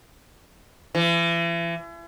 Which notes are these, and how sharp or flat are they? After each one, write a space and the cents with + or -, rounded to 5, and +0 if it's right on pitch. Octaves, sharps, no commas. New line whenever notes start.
E3 +40